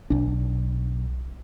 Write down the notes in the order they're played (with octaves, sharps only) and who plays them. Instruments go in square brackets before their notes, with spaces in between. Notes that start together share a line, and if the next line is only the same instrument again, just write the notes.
[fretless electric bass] B1 D4